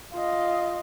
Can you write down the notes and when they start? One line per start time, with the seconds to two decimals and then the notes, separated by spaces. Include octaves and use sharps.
0.13 F4 D#5